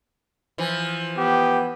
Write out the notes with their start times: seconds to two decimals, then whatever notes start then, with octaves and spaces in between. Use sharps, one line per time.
0.58 E3 F3
1.17 B3 G4